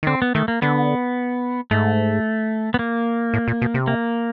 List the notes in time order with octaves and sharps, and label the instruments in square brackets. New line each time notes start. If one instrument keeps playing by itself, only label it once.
[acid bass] D#3
[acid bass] D3 [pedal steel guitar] C4
[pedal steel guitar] B3
[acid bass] D#3 [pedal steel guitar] A3
[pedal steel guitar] A#3
[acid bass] D3 [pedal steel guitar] B3
[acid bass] G#2 [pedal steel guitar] A3
[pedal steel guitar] B3
A#3
[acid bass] A2
A#2
B2
C3
[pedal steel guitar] A#3